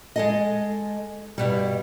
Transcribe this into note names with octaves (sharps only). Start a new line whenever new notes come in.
G#3 A4 D#5
G2 B2 G3